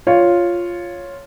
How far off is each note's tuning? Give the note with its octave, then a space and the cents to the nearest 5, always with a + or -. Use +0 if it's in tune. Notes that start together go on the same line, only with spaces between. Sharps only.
F4 +0 C#5 +0